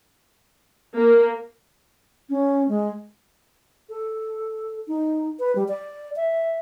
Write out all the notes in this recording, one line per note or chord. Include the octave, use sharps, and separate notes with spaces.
A#3
C#4
G#3
A4
D#4
B4
G3
D5
E5